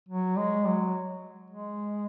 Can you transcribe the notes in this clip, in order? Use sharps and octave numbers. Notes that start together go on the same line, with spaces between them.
F#3
G#3
F#3
G#3